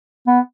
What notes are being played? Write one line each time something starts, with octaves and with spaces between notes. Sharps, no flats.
B3